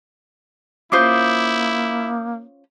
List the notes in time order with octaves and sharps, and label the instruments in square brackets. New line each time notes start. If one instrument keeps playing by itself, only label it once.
[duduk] A#3 [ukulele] C#4 F4 C5 [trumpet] E4 [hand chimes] D6 D#6 G6